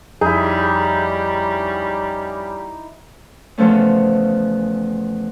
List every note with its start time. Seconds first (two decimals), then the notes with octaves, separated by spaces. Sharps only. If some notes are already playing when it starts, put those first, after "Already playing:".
0.21 F2 G3 C#4 D#4 E4 G#4
3.58 E2 C#3 F3 A3 C#4